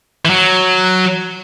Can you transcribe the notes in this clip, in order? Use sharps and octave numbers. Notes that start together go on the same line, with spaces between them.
E3
F#3